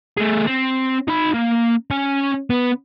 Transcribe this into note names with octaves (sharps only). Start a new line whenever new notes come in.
A3 G#4
C4
D#4 B5
A#3
C#4 G#5
B3